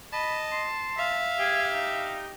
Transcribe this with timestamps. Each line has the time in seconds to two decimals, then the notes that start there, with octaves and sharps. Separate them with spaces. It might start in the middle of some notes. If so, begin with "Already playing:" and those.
0.13 D#5 A5 B5
0.52 C6
0.98 E5 F5
1.39 G4 G#4
1.72 D#4